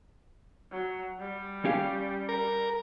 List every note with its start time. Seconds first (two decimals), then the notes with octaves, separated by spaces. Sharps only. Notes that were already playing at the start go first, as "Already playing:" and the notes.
0.72 F#3
1.19 G3
1.65 C#4 G4 F5
2.29 A#4